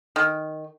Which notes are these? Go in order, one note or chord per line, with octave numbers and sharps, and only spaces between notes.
D#3